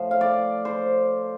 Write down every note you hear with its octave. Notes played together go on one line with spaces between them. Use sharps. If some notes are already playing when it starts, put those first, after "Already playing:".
Already playing: A2 F3
F5
D5
C5